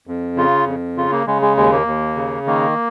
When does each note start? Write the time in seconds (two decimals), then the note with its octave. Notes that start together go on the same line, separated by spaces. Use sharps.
0.07 F2
0.37 C#3 F4
0.67 F2
0.97 C#3 F4
1.12 A#3
1.27 C#3 G#3
1.42 G#3
1.57 D#2 G#3
1.72 A#3
1.87 D#2
2.16 C#3
2.47 D#3 A#3